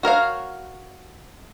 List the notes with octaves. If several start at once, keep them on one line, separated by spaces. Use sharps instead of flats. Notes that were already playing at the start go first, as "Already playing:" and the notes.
F#4 A#4 C#5 F5